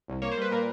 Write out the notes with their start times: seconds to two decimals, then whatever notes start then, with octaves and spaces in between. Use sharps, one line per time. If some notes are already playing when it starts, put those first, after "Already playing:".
0.08 C2
0.22 A#3 C#5
0.31 C5
0.37 G3 B4
0.51 A#2 A#4